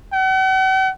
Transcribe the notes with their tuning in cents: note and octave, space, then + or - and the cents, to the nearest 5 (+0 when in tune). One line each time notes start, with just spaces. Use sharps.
F#5 +45